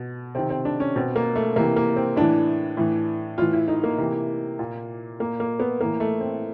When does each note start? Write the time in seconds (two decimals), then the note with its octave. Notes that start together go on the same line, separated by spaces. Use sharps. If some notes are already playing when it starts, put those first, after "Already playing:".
Already playing: B2
0.35 C3 D#3 C4
0.50 C4
0.65 D4
0.80 C#4
0.96 B2 C4
1.16 A#3
1.36 A3
1.56 C3 E3 A#3
1.76 A#3
1.96 C4
2.16 A2 E3 D4
2.77 A2 E3
3.38 A2 E3 F4
3.53 E4
3.68 D#4
3.83 A#3
3.98 C3 E3
4.59 A#2
5.20 A#2 A#3
5.40 A#3
5.60 B3
5.80 A2 E3 A#3
6.00 A3
6.20 C4